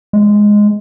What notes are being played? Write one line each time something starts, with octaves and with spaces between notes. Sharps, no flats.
G#3